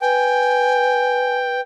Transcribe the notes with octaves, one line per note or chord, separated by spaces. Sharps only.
B4 G5 G#5